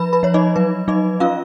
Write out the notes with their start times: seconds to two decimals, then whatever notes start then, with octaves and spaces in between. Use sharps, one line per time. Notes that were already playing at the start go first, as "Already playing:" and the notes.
Already playing: F3 B4 B5
0.13 B4 B5
0.23 F3 C#5
0.34 D#4 D#5
0.56 F#3 B4
0.88 F#3 D#4 D#5
1.20 C#4 F4 F5